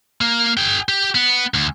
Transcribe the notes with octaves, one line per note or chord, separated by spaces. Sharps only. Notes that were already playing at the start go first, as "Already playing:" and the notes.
A#3
G#4 G5
G4
B3
D2